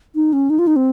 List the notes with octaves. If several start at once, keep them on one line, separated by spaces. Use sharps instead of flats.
D#4
C#4
D#4
F4
D#4
C4